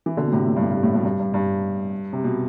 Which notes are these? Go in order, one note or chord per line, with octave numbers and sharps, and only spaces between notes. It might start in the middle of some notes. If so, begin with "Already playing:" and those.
E3
B2 D3
B2
A2 C3
A2
G2
A2
G2
A2
G2 B2
G2
G2
G2
C3
B2